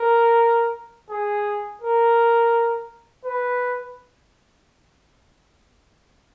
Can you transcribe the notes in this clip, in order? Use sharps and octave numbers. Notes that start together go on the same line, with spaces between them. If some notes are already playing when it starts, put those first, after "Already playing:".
Already playing: A#4
G#4
A#4
B4